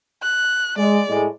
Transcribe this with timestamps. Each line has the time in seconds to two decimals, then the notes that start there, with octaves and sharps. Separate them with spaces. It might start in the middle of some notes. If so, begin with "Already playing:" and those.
0.22 F#6
0.77 G#3 D5
1.08 A2 G#3